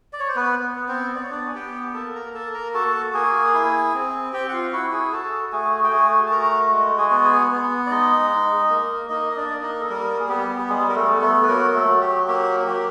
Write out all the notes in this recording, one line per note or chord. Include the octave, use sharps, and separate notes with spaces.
D5
C#5
C5
B3 B4
B3
C4 C5
B3 D5
C#5
D4 D5
G#5
B3 G4 G5
A#3 A4 A5
A#4 A#5
A#3 A4 A5
A#4 A#5
F#4 A4 A5
A#3 G#4 G#5
E4
C4
C4 G4 G5
F#5
F4 F5
E4 F#4 F#5
G#4 G#5
F#4 A4 A5
A3 G#4 G#5
G5
A3 G#4 G#5
A5
F#4 A#4 A#5
G#3
G#4 G#5
B3
G#4 G#5
B3
D5
G#3 D#4 D#5
D#4
A#3
A#3 D#4 D#5
D#5
D4 D5
A#3
D#4 D#5
A4
G3 A#3 A#4
G#4
B3 G4
G4
G3 G#3 G#4
A#4
A3 A4
B3
A3 A4
B4
F#3 A#3 A#4
A3 A4
F#3
G4
A#3 G4
F#3 G4